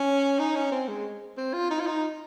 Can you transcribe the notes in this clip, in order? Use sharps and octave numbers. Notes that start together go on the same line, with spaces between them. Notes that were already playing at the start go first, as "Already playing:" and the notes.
Already playing: C#4
D#4
C#4
C4
G#3
C4
F4
D#4
F4
D#4